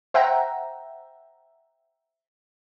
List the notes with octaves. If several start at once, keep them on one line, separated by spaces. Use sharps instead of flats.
C5 E5 F#5 G5 A#5